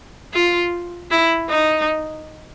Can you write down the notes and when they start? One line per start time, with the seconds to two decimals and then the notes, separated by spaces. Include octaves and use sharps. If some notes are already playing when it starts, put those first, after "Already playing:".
0.33 F4
1.11 E4
1.49 D#4